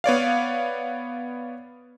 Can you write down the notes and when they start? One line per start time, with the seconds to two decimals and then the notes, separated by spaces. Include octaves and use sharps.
0.04 B3 C#5 D5 F5